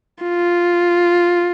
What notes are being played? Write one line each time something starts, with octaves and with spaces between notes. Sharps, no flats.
F4